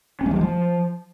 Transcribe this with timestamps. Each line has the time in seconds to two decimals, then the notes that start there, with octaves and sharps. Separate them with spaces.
0.21 C#4
0.26 G#3
0.31 F3
0.36 G#3
0.41 F3